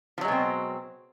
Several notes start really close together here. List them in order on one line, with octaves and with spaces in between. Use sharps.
F3 F#3 G#3 B2 C4